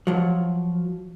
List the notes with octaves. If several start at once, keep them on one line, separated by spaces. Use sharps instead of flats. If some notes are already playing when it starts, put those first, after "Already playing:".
F3 F#3